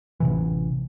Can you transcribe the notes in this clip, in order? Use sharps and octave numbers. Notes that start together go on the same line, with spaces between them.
A1 C3 E3